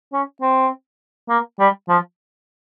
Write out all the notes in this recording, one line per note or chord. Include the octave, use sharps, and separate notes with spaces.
C#4
C4
A#3
G3
F3